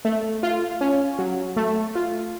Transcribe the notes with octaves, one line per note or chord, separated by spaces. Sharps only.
A3
F4
C#4
F#3
A3
F4